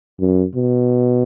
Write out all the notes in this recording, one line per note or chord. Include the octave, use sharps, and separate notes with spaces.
F#2
B2